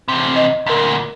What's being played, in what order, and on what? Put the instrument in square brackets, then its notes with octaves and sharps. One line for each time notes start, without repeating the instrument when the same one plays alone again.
[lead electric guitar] E2 C3
[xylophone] D#5
[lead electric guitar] D2 A#2 [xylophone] A#4 B6